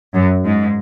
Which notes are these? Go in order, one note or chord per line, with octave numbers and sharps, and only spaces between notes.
F#2
G#2